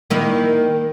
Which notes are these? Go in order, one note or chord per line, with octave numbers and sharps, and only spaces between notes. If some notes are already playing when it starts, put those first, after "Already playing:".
D#3 A#3 E4